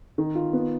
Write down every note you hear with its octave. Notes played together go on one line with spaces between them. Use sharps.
D#3
F4
B3